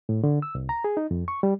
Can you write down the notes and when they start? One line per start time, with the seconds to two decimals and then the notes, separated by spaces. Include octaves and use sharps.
0.09 A2
0.24 D3
0.42 E6
0.55 C2
0.69 A#5
0.84 G#4
0.97 D#4
1.11 F2
1.28 C#6
1.43 G3